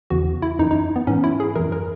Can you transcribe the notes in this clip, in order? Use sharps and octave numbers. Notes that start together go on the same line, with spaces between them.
E2 C#3 E3 F#4
E4
F#2 E3 D#4
D#4
B3
G#2 E3 C#4
E4
G#4
F#2 E3 A#4
A#4